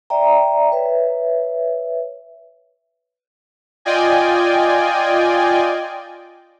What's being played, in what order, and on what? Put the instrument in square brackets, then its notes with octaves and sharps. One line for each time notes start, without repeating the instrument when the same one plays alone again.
[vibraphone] D5 E5 G5 A#5
B4 C#5 E5
[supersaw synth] F4 D5 D#5 G5 G#5